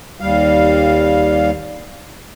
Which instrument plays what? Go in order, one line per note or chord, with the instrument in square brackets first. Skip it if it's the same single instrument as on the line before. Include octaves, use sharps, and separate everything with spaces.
[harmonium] D#2 G3 F5